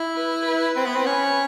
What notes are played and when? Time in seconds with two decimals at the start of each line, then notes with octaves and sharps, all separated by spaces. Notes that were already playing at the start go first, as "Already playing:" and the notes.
Already playing: E4
0.17 B4
0.47 B4
0.76 C4
0.86 B3
0.96 C4
1.06 C#4